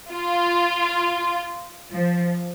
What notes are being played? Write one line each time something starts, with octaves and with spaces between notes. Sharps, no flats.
F4
F3